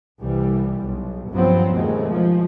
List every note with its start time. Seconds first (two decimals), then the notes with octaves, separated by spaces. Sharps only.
0.20 C2 E3 G3
0.81 B1
1.32 G2 F3 F#3 B3 C4
1.72 D#2 B2 G#3 A3
2.11 F3